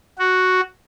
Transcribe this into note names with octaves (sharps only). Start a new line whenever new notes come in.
F#4